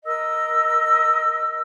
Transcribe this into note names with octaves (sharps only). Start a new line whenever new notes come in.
A#4 D#5 E6